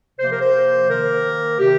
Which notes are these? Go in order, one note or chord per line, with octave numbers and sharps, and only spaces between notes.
C3 F3 A#3 C5
A#4
C5
D#3 A#4
A#3
C3 D#3 G4